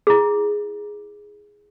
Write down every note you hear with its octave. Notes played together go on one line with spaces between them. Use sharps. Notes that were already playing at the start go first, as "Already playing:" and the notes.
E4 G#4